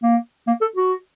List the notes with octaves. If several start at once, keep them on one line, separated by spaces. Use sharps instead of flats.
A#3
A#3
A4
F#4